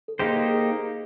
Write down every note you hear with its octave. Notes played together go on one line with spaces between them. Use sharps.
A4
A#3 D#4 G4 G#4 C5
G#4
G#4